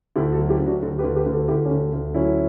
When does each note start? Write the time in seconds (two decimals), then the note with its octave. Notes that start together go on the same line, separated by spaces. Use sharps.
0.16 D2 E4 G4
0.32 F#4 A4
0.38 F#3
0.49 E4 G4
0.60 D2
0.66 D4 F#4
0.82 D2 F#4 A4
0.98 G4 B4
1.04 D2
1.16 G4 B4
1.26 D2
1.31 F#4 A4
1.48 D2 E4 G4
1.65 C#4
1.71 D2
1.93 D2
2.14 F#3 C#4 E4